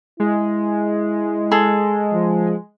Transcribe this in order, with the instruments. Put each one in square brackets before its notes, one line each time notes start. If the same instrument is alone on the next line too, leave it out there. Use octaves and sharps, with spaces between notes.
[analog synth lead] G#3 [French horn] E4
[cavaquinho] G#4 A4
[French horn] F3